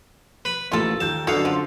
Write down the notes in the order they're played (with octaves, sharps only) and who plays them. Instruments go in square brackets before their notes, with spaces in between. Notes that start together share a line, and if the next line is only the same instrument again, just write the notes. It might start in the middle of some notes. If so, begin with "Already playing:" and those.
[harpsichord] B4 B5
[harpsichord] A1 [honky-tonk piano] A#3 [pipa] F4 A4
[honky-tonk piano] D#2 G6 [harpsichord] A5
[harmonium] F#2 D3 D4 [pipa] B2 [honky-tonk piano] F#4 [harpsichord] A4 F5
[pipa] F3 [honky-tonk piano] C6